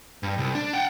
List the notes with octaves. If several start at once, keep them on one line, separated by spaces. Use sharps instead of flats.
G2
C2
D4
F#5 G5